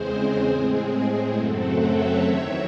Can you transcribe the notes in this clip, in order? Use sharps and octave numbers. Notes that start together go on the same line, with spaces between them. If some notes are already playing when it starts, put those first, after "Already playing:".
Already playing: E2 C#3 G#3 C4 G#4 C5
A2 G#3 C4 G#4
F#2 C#3 F#3 A3 C4 F#4 A4
C#5 E5
E2 D#3 F#3 C4 C#5 E5